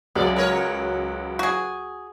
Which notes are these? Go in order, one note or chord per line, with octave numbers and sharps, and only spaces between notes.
C#2 F#2 F#3 D5
A#4 B4 C#5
F#4 G#4